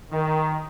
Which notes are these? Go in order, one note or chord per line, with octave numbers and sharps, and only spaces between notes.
D#3